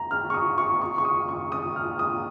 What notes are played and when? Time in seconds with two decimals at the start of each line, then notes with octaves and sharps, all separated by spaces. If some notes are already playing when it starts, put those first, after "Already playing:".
Already playing: A#5
0.11 F6
0.30 C#6
0.34 D#6
0.58 C#6
0.81 C#6
0.98 C#6
1.05 D#6
1.29 C#6
1.52 D#6
1.76 F6
1.99 D#6